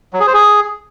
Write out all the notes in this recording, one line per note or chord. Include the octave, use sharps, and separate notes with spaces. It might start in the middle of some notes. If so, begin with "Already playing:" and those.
F#3
G#4
C5
G#4